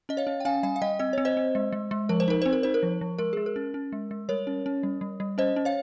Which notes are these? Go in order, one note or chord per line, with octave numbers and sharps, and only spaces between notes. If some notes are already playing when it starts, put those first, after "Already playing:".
C#4 D#5
C#5 F5
C#4
G5
C#4 F5 G#5
G3 F5 G#5
F5
G3 D#5 G5
C4 D#5
C4 C#5
C5 D#5
C4
G#3
G#3
G#3
F3 A#4
C5
D#4 A#4
C4 C5
A#4
D#4 C5
A#4
F3
F3
G#3 A#4
G#3 G#4
A#4
C#4
C#4
G#3
G#3
G3 A#4 C#5
C#4
C#4
G3
G3
G3
C#4 C5 D#5
C#4
C#5 F5